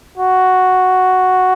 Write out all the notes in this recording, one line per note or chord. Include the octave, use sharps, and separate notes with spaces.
F#4